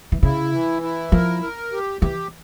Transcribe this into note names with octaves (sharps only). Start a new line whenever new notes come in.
E3
C#3 E4
E3
E4
F3 A#4
A#4
G4
E3 G4